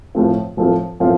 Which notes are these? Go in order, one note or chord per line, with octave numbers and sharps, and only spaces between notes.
A2 F3 A3 C4 F4
A2 F3 A3 C4 F4
A2 F3 A3 C4 F4